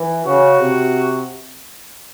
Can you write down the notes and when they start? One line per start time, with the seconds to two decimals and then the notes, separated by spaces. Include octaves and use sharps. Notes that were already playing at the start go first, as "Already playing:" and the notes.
Already playing: E3
0.25 C#3 F#4
0.59 C3